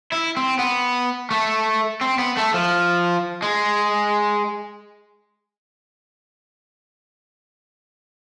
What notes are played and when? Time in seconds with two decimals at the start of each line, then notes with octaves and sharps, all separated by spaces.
0.12 E4
0.37 C4
0.59 B3
1.31 A3
2.01 C4
2.19 B3
2.37 A3
2.54 F3
3.43 G#3